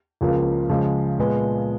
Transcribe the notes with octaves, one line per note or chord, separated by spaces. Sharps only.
C#2 C#3 F3 A#3
C#3 F3 G#3
A#2 G#3 B3